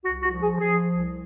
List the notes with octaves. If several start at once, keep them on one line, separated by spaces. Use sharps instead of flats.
C2 F#4
F#4
F3
G#4
F3 G#4
C2